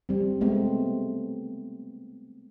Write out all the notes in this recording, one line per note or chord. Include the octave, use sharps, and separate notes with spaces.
G3 C4
G#3 A3 B3 C4